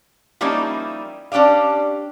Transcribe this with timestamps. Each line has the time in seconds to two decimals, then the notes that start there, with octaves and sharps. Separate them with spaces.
0.41 F3 G3 A#3 C#4 D#4 E4
1.32 C#4 D4 G4 D5 F5